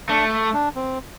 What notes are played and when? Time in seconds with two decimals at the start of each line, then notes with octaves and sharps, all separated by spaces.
0.09 A3 D4
0.53 D4
0.75 C4